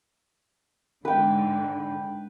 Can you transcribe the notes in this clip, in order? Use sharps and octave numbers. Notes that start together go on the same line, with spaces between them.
G#2 D3 B4 G5